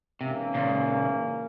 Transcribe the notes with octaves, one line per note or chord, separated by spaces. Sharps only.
G#2 C3 E3 A#3 C#4
A#2 C#3